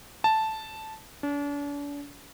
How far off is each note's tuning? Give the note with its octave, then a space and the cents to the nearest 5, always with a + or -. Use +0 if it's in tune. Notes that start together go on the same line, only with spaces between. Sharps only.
A5 -5
D4 -40